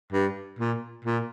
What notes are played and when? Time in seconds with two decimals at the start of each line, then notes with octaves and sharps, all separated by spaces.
0.13 G2
0.59 A#2
1.05 A#2